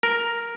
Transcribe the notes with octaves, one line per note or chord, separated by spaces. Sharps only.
A#4